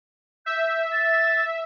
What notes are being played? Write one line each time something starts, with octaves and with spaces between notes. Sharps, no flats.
E5 G6
A6